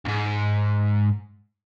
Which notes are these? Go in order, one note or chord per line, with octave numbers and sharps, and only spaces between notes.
D2 G#2